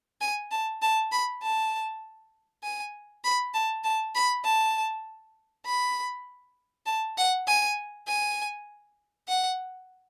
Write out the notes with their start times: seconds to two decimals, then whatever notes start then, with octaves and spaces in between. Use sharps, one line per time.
0.21 G#5
0.51 A5
0.82 A5
1.11 B5
1.42 A5
2.63 G#5
3.24 B5
3.54 A5
3.84 A5
4.15 B5
4.44 A5
5.65 B5
6.86 A5
7.17 F#5
7.47 G#5
8.07 G#5
9.28 F#5